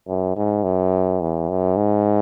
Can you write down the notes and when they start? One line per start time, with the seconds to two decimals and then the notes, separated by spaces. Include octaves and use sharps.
0.08 F#2
0.36 G#2
0.64 F#2
1.21 E2
1.49 F#2
1.77 G#2